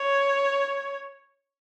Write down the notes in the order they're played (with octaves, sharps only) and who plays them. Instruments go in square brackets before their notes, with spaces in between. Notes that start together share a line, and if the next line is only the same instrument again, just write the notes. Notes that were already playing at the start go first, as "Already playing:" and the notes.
Already playing: [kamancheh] C#5